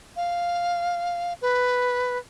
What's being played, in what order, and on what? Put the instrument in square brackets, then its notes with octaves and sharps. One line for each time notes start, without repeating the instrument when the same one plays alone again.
[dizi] F5
B4